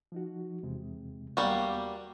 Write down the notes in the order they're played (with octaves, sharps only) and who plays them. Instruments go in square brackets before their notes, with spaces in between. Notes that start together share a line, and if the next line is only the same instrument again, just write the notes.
[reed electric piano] F3 D#4 F#4
E2 C3 G#3
[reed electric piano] D#2 B3 A6 [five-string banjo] G3 A#3 F#4